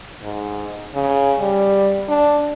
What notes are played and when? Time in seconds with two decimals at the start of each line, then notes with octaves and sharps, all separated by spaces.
0.23 G#2
0.95 C#3
1.40 G3
2.09 D4